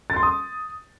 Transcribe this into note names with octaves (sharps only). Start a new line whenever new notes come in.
A6
C6
D#6